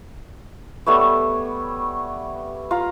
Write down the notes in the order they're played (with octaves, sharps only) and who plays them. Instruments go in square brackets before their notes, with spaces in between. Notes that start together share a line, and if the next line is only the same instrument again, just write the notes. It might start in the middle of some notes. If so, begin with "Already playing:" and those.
[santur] G3 A3 B3 C#5
F4 A#5